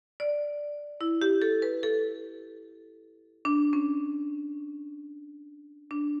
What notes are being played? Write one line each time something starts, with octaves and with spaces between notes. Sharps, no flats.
D5
E4
G4
A4
B4
A4
D4
C#4
D4